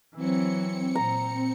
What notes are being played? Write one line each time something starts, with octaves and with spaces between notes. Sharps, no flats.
E3 F#3 C4 C#7
A#2 A#5